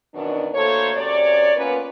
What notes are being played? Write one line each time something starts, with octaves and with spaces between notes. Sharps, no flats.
F#2 B2 D#3 E3 D4
D2 A#3 A4 C5 C#5
F#2 C3 C#5 D5
A#3 B3 C#4 F4 A#4 B4